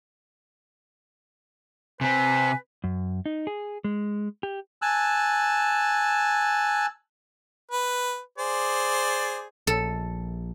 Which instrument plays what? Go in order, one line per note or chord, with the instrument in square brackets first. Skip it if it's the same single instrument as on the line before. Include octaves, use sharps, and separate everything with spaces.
[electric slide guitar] C3 C4 [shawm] B4 [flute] G#5
[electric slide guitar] F#2
D#4
G#4
G#3
G4
[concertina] G#5 A5 E6 F#6
[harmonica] B4
G#4 C5 D5
[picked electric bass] A#1 [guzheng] A4